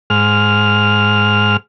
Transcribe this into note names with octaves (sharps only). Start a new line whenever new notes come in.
G#2 F6